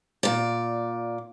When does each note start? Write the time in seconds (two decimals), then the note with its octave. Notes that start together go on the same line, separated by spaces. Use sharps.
0.23 A#2 D5